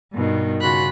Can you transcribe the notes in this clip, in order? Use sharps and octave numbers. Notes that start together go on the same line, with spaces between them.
G2 B2 D#3
C#3 F4 F#4 B5 F#6